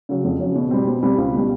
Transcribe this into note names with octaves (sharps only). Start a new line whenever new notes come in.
C#3 F#3
F2
C#3 F#3
B2
G3 C4
B2
G3 C4
C#2
B2 G3